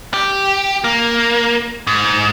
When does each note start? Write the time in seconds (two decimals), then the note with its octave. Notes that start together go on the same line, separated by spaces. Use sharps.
0.14 G4
0.84 A#3
1.87 G#2